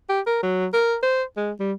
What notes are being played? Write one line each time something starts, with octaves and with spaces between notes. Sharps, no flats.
G4
A#4
F#3
A#4
C5
G#3
G3